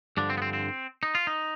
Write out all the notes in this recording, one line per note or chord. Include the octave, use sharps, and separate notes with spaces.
G2 D3 F3 D4
C4
B3
C4
C4
D#4
F4
D#4